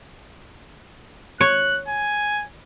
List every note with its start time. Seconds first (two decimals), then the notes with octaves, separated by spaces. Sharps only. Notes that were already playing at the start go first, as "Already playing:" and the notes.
1.41 C#5 F#6
1.89 G#5